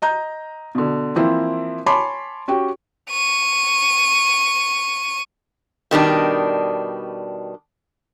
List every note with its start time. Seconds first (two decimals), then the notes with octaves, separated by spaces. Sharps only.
0.02 D#5 A#5 G6
0.75 B2 D3
1.16 E3 F3 A#3 C4 E4
1.86 C#5 G#5 A5 B5 C6 D6
2.48 C#4 F#4 G4 G5
3.10 C#6 D#7
5.91 B2 D#3 G3 D4